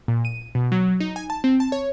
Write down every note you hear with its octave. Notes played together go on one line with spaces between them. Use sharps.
A#2
D#7
B2
F#3
D#4
G#5
A5
C4
A5
C#5